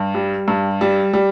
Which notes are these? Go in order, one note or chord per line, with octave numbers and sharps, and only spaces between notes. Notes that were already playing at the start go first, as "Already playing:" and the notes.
Already playing: G2
G3
G2
G3
G3